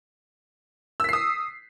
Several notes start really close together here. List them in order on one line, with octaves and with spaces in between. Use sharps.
E6 B6 C7 D#6